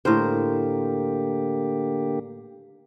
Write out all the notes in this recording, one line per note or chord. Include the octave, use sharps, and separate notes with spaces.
A2 D3 A#3 G4 A#4 C5